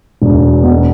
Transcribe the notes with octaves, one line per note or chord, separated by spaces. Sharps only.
E1
B2